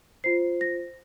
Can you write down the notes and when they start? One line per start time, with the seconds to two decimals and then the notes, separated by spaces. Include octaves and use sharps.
0.24 F4 C5 C7
0.61 A#6